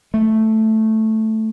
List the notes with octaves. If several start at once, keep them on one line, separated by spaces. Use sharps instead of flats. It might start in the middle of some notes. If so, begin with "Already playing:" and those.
A3